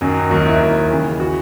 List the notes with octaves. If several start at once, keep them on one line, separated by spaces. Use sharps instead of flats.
F#2 D#3 F#3
D#2 D#3 F#3 F#4
E4
D#2 D#3 F#3
D#2 C#3 E3
E3 F#4